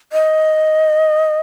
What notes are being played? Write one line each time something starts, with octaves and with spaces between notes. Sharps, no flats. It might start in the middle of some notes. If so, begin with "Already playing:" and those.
D#5